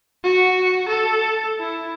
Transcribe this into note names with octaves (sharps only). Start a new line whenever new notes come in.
F#4
A4
E4